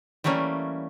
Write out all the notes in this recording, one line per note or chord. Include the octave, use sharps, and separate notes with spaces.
E3 G3 A3 A#3 C#4